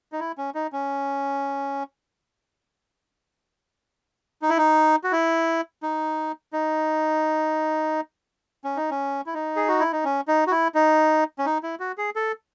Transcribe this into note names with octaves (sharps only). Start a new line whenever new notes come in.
D#4
E4
C#4
D#4
C#4
D#4
E4
D#4
F#4
E4
D#4
D#4
C#4
D#4
C#4
E4
D#4
G#4
F#4
E4
D#4
C#4
D#4
F#4
E4
D#4
C#4
D#4
E4
F#4
G#4
A4